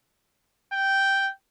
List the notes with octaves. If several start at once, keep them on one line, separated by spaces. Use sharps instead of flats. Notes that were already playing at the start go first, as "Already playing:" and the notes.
G5